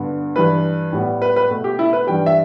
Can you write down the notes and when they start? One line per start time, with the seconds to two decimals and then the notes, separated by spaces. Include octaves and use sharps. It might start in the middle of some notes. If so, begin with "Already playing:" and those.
Already playing: G2 D3 B3
0.36 G2 E3 G3 B4
0.93 A2 G3 B3
1.22 B4
1.36 B4
1.50 B2 A3
1.64 G4
1.79 E4
1.93 B4
2.07 G2 E3 G3 G5
2.26 E5